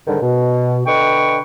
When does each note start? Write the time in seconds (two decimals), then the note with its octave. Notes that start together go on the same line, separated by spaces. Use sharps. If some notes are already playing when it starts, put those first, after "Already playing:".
0.07 G#2 D3 D#3 G3
0.21 B2
0.87 D3 B4 D#5 G5 C#6